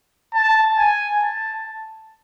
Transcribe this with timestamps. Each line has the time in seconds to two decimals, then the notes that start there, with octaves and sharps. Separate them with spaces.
0.34 A5
0.78 G#5
1.22 A5